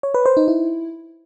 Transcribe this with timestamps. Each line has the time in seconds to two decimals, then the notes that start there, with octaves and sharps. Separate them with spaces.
0.03 C#5
0.14 B4
0.26 C5
0.37 D#4
0.48 E4